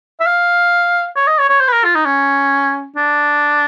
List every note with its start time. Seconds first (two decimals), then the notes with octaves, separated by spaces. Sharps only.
0.20 E5
0.26 F5
1.16 C#5
1.27 D#5
1.39 C#5
1.50 C#5
1.61 C5
1.68 B4
1.73 A#4
1.84 F4
1.95 D#4
2.06 C#4
2.96 D4